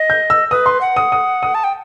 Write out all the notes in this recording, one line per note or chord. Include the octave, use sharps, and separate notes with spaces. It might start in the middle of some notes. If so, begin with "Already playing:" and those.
Already playing: D#5
G6
E6
B4 D#6
C6
F#5
D#6
D#6
D#6
A5
G5